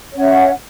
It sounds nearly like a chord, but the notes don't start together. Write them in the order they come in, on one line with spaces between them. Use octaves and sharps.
C#5 C#4 F#5 E5